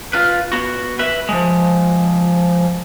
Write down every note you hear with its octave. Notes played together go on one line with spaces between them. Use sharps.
F4 B4
B3 F#4
B4 E5
F3 G#3